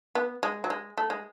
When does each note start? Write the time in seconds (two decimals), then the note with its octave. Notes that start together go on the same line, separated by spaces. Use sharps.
0.15 B3
0.43 G#3
0.64 F#3
0.70 G#3
0.98 A3
1.10 G#3